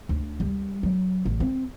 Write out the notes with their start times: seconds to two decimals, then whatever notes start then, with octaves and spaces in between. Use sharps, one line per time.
0.09 D2
0.40 G3
0.83 F#3
1.25 A1
1.40 C4